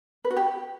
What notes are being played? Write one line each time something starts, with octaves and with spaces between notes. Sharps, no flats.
B4
F#4
G4